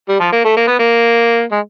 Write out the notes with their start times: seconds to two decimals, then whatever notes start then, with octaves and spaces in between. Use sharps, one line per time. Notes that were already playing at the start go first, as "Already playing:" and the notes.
0.09 G3
0.20 F3
0.32 A#3
0.45 A3
0.57 A#3
0.67 B3
0.79 A#3
1.51 G#3